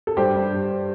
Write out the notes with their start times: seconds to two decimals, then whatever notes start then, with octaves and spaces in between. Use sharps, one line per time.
0.07 A4
0.17 G2 G4 C5
0.36 G2
0.53 G3